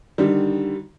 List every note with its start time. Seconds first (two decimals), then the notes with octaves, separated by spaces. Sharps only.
0.18 D3 D#3 G3